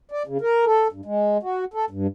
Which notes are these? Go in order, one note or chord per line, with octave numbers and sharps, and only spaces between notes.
D5
C#3
A#4
A4
G2
G#3
F#4
A4
G2